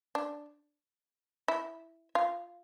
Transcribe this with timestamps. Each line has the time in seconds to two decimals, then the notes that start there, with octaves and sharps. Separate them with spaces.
0.15 D4
1.48 E4
2.15 F4